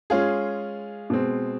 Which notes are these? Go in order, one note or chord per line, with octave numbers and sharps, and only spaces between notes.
G#3 C#4 F4 G#4
B2 G#3 C4